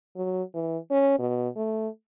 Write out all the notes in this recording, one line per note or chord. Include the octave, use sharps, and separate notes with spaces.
F#3
E3
C#4
B2
A3